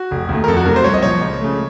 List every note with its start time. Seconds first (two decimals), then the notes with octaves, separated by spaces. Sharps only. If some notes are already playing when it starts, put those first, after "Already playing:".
Already playing: F#4
0.11 F1
0.29 D#2 D#3 A3
0.44 A#4
0.48 F2 A4
0.57 F#4
0.66 C3 F#3 A3 A#4
0.76 C5
0.84 C2 C#5
0.94 D#5
1.02 A#2 F3 C#5
1.21 C#2
1.40 C#3 A3